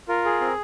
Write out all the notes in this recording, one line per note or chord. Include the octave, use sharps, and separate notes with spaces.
F4 A#4
G#4
C4